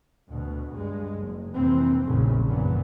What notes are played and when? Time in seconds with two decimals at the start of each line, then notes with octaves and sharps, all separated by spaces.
0.29 D2 B2
0.74 G2 G#3
1.17 F#1
1.54 F1 C3 E3 A#3 C4
2.04 F1 A#1 F#2 C#3
2.47 G#1 F#2 A#2 E3 B3